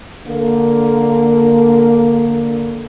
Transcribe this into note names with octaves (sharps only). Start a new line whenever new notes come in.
D3 A#3